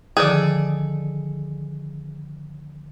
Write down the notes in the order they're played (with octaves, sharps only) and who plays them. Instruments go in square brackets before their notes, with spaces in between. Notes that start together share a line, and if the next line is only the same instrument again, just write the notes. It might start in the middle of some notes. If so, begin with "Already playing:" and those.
[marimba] D3 D#3 F3 [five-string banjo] G#4 A4 D5